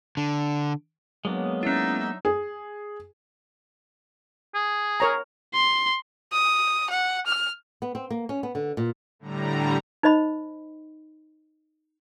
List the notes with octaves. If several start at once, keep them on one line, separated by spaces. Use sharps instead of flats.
D3
F#3 G#3 A#3 B3 D4
C#4 D#4 E4 E5
G#4
G#4
A#4 C#5 A#5
C6
D#6
F#5
F6
B3
C4
A#3
C#4
B3
D3
A#2
A2 D3 G3 A#5
D#4 C5 D#5 B5